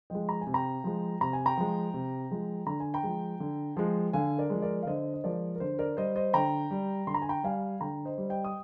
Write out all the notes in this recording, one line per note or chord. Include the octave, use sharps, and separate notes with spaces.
F3 G#3 D#5 G5
A#5
G#5
C3
G5 A#5
F3 G#3
C3 A#5
G#5
G5 A#5
F3 G#3
C3
F3 G#3
D3 A#5
G#5
G5 A#5
F3 G#3
D3
F3 G#3
D3 F5 G#5
A#4 D5
F3 G#3
A#4 D5
F5
D3 C5 D#5
D#5
F3 G#3 A#4 D5
A#4
D3 C5
A#4 D5
G3 C5 D#5
C5 D#5
D3 G5 A#5
G3
D3 C6
A#5
G#5
G5 A#5
G3 F5 G#5
D3 G5 A#5
C5 D#5
G3
D#5 G5
D#6